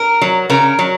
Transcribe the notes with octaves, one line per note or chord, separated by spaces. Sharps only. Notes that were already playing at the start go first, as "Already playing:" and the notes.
Already playing: A#4
F#3
C#3 A#4
F#3